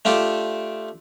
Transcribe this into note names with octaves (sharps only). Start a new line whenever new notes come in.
A3 D4 F4 G4 A4